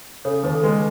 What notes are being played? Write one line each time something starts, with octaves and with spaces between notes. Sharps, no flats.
C#3 A4 C#5
D#2 B4
A4
G#3 B4